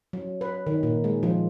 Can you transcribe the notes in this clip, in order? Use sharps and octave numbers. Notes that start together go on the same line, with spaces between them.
F#3
B4
D#3
A#2
G#3
F3